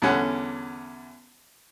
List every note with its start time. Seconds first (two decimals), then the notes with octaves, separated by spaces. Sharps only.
0.02 E2 D3 G3 C#4 F#5 F#6